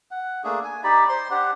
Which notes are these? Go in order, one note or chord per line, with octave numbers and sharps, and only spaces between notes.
F#5
A3 A#3 D4 G#4
G#5
D#4 G4 D5 B5
C5 C6
D4 G4 F#5